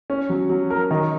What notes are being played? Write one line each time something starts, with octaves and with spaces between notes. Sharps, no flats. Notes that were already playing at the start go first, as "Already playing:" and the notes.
C#4
F#3
F#3
A#4
D#3